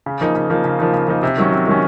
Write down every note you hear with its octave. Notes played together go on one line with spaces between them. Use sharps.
C#3
F3 A#3 D#4
C#3
F3 A#3 D#4
C#3
F3 A#3 D#4
C#3
F3 A#3 D#4
C3
D#3 F#3 C#4
C3
D#3 F#3 C#4